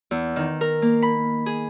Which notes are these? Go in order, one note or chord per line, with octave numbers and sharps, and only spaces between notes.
E2
D#3
A#4
A#3
B5
G#4